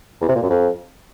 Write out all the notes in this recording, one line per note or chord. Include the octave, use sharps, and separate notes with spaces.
E2
C3
A#2
F#2
F2